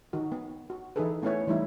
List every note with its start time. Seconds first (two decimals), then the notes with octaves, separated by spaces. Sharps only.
0.13 D#3 D#4 F#4
0.32 B3
0.70 F#4
0.96 E3 D#4 E4 G#4 A4 B4
1.22 A3 B3 C#4 E4 B4 C#5
1.47 E3 G3 A3 D#4 E4